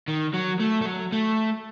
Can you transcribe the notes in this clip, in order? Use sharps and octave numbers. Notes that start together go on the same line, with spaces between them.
D#3
F#3
A3
A3
F#3
A3